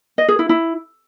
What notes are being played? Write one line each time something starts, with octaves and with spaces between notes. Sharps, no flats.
D#5
G#4
E4
E4